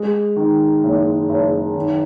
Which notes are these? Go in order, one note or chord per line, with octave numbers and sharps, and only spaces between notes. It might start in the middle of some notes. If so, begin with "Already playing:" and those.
Already playing: G#3
D#3
F#1
F#1
D#3